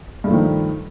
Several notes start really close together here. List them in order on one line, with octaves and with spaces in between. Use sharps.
G2 A3 F3 D#3